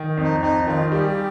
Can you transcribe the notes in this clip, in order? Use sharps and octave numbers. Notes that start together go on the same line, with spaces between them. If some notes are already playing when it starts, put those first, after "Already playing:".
Already playing: D#3
F2
D#4
F2 D#4
D#3 F4
G3 G4
G#4
G4